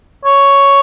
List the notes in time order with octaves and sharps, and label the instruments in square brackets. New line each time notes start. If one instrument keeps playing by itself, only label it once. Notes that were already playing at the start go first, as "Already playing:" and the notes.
[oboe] C#5